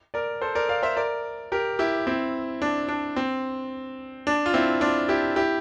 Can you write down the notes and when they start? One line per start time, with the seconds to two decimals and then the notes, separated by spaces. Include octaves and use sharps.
0.14 A#4 D5
0.42 A4 C5
0.55 A#4 D5
0.69 D5 F5
0.83 C5 E5
0.97 A#4 D5
1.52 G4 A#4
1.79 E4 G4
2.07 C4 E4
2.62 D4
2.89 D4
3.16 C4
4.27 D4
4.46 F4
4.54 C4 E4
4.81 D4 F4
5.09 E4 G4
5.36 E4 G4